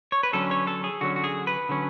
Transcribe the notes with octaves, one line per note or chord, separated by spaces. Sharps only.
C#5
B4
D3 F#3 C#4 A4
C#5
A4
G#4
D3 F#3 C#4 F#4
F#4
G#4
B4
D3 F#3 C#4